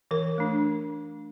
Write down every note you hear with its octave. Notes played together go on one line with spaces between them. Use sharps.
E3 A#4
A3 D4